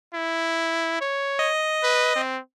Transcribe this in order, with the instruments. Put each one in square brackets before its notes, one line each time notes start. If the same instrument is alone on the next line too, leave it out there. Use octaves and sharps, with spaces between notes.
[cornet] E4
C#5
[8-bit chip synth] D#5
[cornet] B4
C4